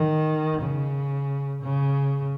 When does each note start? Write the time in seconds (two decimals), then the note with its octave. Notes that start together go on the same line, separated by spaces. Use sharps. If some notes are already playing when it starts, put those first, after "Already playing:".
Already playing: D#3
0.60 C#3
1.62 C#3